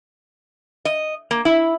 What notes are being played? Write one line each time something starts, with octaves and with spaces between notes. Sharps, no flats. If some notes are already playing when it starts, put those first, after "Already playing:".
D#5
A#3
E4